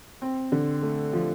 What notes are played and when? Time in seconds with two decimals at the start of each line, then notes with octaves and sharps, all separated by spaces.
0.22 C4
0.52 D3
0.82 A3
1.13 F3